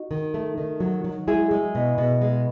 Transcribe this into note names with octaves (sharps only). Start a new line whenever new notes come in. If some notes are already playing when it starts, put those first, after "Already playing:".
Already playing: D#4 F#4
D#3
A3
D#3
F#3
F#3
G#3 E4 G#4
G#3
B2
B2
G#3